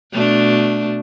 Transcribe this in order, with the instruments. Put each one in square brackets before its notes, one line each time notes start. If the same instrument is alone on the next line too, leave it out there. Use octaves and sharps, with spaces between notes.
[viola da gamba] B2 A3 D4